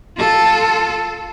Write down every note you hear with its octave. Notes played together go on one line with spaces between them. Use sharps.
F4 A4